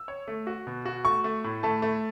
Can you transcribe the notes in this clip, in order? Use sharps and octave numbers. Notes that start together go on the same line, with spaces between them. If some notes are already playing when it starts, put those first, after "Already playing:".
Already playing: E6
C#5
A3
F#4
B2
F#4
A3 C#6
A3
A2
A3 A5
A3